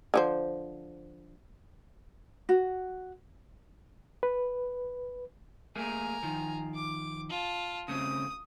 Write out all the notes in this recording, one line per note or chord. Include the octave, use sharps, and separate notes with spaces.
D3 F3 C5
F#4
B4
A3 A#3 G#4 G#5 A#5
D#3 F3
D6
F4 A5
C#3 A3 C4 D#6